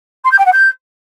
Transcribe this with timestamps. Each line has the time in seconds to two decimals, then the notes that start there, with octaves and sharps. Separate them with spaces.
0.24 C6
0.31 G6
0.38 G5
0.45 F#5
0.52 G6